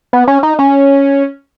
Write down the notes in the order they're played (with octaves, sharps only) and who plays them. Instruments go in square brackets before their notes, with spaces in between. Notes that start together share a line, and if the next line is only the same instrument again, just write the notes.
[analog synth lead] B3
C#4
D#4
C#4